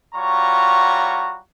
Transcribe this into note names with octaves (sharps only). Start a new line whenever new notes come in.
G3 F4 F#4 C#5 A#5 C#6